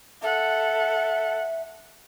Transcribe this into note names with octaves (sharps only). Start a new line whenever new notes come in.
A4 E5 F#5